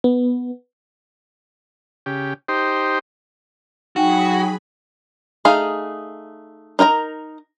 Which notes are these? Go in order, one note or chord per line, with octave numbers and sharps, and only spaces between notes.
B3
C#3 G4
D#4 G4 C5
F#3 D#4 F#4 G#4 G5 G#5 B5
A3 D#4 G#4 F5
D#4 A#4 G5 A#5